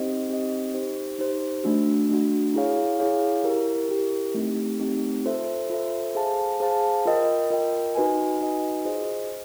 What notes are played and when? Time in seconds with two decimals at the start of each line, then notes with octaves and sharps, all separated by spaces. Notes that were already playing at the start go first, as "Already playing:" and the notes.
Already playing: C4 D#4 G4 C5 D#5
0.29 C4 D#4 G4 C5 D#5
0.74 D#4 G4 C5
1.19 D#4 G4 C5
1.64 A3 D4 F#4
2.09 A3 D4 F#4
2.54 E4 G#4 C#5 F5
2.99 E4 G#4 C#5 F5
3.44 E4 G4 A#4
3.89 E4 G4 A#4
4.35 A3 C4 D#4 G4
4.80 A3 C4 D#4 G4
5.25 F4 A4 C5 E5
5.70 F4 A4 C5 E5
6.15 G#4 C5 F5 A5
6.60 G#4 C5 F5 A5
7.06 F4 A#4 D#5 G5
7.50 F4 A#4 D#5 G5
7.95 D#4 F#4 B4 D#5 G#5
8.40 D#4 F#4 B4 D#5 G#5
8.85 F4 G#4 C5 D#5